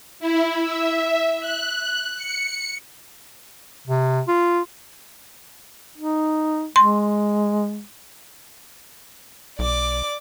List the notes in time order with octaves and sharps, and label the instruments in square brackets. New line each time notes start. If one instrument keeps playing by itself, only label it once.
[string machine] E4
E5
F#6
C#7
[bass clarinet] C3
F4
[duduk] D#4
[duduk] G#3 [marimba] C6
[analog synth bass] B1 [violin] D5 D6